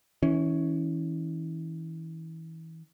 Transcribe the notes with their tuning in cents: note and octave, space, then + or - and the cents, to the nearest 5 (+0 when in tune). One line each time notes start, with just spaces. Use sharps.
E3 -30 C#4 +0